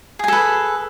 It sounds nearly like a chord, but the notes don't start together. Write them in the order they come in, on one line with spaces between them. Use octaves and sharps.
G#4 G#5 A4 B4